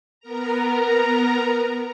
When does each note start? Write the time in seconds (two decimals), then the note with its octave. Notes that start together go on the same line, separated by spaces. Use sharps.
0.20 B3 A#4 A#5